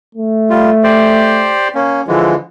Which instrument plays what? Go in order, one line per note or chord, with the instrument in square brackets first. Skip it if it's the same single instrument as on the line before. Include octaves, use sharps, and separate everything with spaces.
[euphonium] A3
[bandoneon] G3 F4
G4 C5 D5
A#3 C#4
[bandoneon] D3 E3 G#3 [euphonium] F3